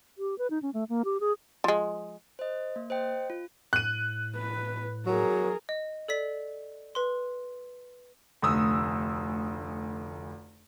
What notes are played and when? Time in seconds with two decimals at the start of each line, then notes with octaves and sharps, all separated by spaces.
0.18 G4
0.38 B4
0.50 D#4
0.62 C#4
0.74 A3
0.89 A#3
1.05 G4
1.20 G#4
1.64 F3 G#3
2.39 C5 D#5
2.76 A#3
2.90 C5 D#5 G5
3.30 F4
3.73 A2 F#6 D#7
4.36 B4
5.07 F#3 G#4 A#4
5.69 D#5
6.08 A4 D5 B6
6.95 B4 C6
8.42 F1 D2 D#6 E6